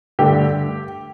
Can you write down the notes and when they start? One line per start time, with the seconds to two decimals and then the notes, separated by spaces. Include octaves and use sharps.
0.19 G2 D3 A3 G4